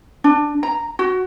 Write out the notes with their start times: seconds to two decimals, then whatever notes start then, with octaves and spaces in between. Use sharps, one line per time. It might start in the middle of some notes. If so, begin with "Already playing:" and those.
0.24 D4
0.63 A#5
0.99 F#4